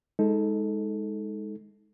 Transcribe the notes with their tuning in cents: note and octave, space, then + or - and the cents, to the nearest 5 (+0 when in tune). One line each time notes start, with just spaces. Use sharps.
G#3 +0 D#4 +25 A4 -5